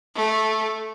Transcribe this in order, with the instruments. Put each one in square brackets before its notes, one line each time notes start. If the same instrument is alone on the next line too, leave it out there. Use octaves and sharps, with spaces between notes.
[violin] A3